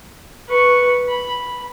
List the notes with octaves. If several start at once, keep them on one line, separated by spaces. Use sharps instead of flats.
B4 C#6
B5